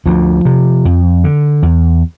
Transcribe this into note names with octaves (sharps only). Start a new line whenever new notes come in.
D2 F3
C3
F2
D3
E2